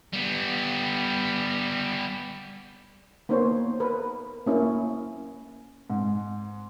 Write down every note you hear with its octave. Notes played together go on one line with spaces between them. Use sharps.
G3 B3
A#3 B3 D#4 C5 C#5
A#4 B4
A#3 C#4 E4
G#2